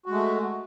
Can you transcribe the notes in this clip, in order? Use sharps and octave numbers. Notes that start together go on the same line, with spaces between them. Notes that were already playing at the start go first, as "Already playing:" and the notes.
G#3 A3 F#4